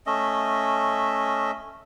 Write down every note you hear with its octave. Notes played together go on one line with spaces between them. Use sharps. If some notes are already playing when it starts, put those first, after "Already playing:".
A3 C#4 D#5 E5